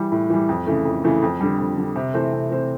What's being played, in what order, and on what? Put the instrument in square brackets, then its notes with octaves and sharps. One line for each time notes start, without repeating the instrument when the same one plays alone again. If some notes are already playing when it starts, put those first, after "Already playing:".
Already playing: [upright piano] E3 G3
A2
E3 G3
F2
C#3 E3 A3
F2
C#3 E3 A3
F2
D3 G3
F2
D3 G3
C3
E3 A3 C4
C3
E3 A3 C4